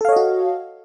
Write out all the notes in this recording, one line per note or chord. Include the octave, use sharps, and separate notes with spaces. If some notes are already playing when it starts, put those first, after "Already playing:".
F#4 A4 C#5 D#5 F5